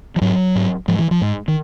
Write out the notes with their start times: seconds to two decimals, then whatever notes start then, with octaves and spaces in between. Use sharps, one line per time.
0.16 F3
0.21 G#2 F#3
0.55 G#2
0.88 G#2 F3
0.99 E3
1.11 F3
1.21 G#2
1.48 D#3